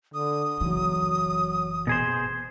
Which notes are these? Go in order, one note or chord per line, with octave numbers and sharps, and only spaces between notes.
D3 D#6
F#1 E3 F#3
B2 G#4 C5